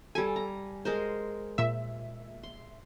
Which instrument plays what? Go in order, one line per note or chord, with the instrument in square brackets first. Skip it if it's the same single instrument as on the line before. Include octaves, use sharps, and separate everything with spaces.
[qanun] G3 A4 [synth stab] G#5
[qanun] A#5
G#3 A#4 C5
[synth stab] A#2 E5
[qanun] C6